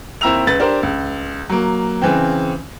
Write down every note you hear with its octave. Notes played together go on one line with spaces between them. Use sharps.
D#2 C4 E4 A#5 E6 F7
C#2 B4 A6
D4 G4 A#4 C5 D5
C#2
F#3 A#3
C#3 E3 C4